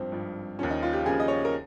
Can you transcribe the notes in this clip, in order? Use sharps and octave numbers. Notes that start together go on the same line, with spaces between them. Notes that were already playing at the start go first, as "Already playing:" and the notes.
Already playing: G#1 G2 F3 C4
G#1 G2 F3
D#2 C#3 F3 C#4
D#4
F4
G4
D#2 C#3 F3 G#4
D#5
C#5
A#4